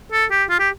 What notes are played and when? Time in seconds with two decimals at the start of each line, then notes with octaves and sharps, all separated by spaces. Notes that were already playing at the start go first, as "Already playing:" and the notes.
0.12 A4
0.31 G4
0.50 F4
0.59 G4